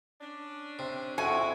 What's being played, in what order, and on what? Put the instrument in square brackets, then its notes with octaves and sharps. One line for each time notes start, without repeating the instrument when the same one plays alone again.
[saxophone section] C#4 D4
[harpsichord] C3
[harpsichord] F2 [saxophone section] C#3 E4 [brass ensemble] C4 F#4 [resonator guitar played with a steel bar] G#5